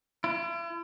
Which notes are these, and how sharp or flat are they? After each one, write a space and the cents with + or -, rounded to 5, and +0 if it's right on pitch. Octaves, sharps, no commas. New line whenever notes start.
E4 +45